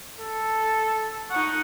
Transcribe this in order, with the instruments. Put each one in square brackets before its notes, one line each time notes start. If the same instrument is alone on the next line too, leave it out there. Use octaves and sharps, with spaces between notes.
[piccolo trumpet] A4
[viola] D#4 F#5 [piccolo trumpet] C#6